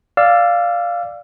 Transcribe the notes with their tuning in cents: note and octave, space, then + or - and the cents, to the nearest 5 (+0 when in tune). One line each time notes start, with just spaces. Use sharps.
D5 +0 F5 +0 E6 +30